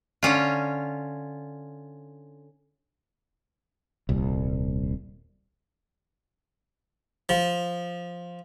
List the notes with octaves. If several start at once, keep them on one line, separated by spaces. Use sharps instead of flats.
D3 C#4 F4
D#1 C2
F3